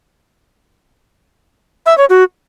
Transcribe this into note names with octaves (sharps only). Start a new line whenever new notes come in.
E5
C#5
F#4